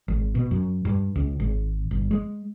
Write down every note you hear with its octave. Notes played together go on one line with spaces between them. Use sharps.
G#1
B2
F#2
G2
C#2
G#1
G1
G#3